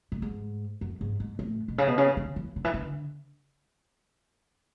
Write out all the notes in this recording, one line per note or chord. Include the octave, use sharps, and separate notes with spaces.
A2
G#2
F#2
G#2
G#2
A2
B2
C#3
B2
C#3
D3
E3
D3
E3
D3